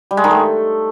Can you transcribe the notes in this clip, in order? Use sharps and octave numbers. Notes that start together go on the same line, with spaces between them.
G3
G#3
D#3
A3